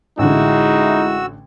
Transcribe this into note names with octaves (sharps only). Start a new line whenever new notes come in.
A1 D3 G#3 D#4 E4 F#4 E6